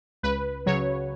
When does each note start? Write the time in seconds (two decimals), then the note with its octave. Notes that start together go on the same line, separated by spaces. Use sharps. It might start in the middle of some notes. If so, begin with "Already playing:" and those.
0.23 C#2 B4
0.66 C#3 F#3 C#5